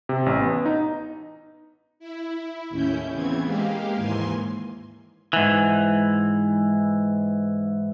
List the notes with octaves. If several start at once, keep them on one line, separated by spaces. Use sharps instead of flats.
C3
A1
B3
D#4
E4
D#2 A2 C#4 E4 G6
C#3 E3 B3 C4 G#6
G#3 A#3 G4 F5
D#2 G#2 E3 G#5 C6
G#2 E3